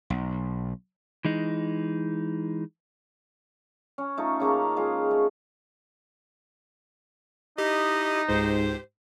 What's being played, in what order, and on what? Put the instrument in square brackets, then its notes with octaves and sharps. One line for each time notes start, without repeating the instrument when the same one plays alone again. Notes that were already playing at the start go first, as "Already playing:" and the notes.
[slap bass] B1
[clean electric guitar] E3 G#3 D#4
[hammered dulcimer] C#4
A3 D#4 F4
C#3 A#3 A4 A#5
G#3 F4
A3
[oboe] D#4 [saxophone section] E4 D#5 [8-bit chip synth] G4
[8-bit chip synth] C#2 [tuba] G#2 [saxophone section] G4 C5